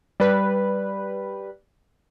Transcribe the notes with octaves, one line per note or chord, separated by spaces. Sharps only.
G3 B4